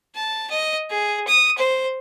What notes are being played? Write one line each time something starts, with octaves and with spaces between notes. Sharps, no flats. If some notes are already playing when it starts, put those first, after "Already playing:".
A5
D#5
G#4
D#6
C5